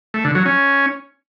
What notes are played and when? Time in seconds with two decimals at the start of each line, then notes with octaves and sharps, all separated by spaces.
0.14 A3
0.25 D3
0.35 F#3
0.46 C#4